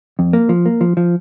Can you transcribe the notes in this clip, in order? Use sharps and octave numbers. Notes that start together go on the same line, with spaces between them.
F2
A#3
F3
A#3
F3
F3